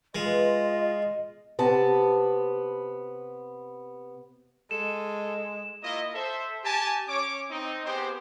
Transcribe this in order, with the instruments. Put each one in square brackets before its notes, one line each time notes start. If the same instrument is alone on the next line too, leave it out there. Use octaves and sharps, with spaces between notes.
[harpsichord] G#3 [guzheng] A3 B3 [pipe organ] F4 [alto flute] D#5
[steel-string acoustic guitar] C3 B3 A5
[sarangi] G#3 [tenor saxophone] A4 [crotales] E7
[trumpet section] A#3 E4 F4 D#5
A4 C5 E5
G4 G#5 A5
C#4 C#5 D6
C4 D#4
B3 C4 G4 G#4 C5 G5